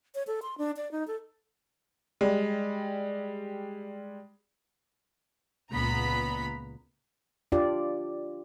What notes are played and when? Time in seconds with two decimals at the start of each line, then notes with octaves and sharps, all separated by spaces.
0.15 C#5
0.27 A4
0.42 C6
0.58 D4
0.77 D5
0.92 D#4
1.07 A4
2.21 G3 G#3
5.71 C#2 A#2 B3 A#5 B5 B6
7.52 D4 F4 G4 D5